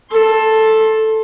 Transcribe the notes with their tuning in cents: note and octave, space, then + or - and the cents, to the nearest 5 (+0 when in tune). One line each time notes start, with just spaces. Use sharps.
A4 +0 C6 +30